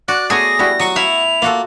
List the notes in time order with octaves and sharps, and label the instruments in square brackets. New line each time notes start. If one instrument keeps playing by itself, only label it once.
[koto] F#4 [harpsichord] D5 [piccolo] F#6
[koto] A3 B3 C#5 [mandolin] G#4 [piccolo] A#6
[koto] G3 E4 F#4
[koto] F#3 [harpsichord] F#4 C#6 D#6
[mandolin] E4 [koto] F5 [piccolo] F7
[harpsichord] A#3 [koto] F4 F#4 A4